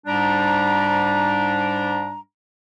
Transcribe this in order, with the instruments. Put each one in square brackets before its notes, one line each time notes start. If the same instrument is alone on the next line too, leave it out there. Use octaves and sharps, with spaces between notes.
[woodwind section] G#2 G3 D4 A#5